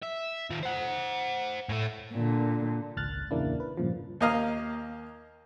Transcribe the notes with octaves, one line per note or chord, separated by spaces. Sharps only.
E5
D#3 F4
C5 F#5
A2 A3
A#2 D3
G#1 C#2 F6 F#6 A6
E2 A#2 C#3 A#3 D4 E4
B4
G2 A#2 C#3 F3
D#2 A#3 D#5 F5 A#5